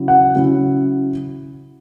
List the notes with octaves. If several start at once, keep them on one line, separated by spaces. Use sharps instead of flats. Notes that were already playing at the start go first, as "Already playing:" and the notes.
Already playing: C#3 F#3 C#4 E4
F#5
C#3 F#3 C#4 E4